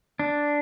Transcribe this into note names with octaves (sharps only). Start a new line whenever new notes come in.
D4